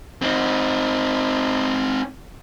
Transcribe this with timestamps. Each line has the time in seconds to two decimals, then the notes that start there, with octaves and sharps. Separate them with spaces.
0.22 C4 D#4